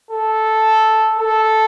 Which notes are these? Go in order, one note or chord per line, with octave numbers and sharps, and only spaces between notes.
A4
A4